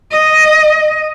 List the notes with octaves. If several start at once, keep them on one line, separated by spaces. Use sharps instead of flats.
D#5